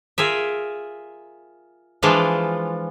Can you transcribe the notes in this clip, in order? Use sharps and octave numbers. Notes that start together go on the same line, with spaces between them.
F4 G#4 A#4 E5
E3 F3 G#3 D4 F4